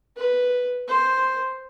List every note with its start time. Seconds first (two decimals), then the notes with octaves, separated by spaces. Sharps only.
0.16 B4
0.88 C5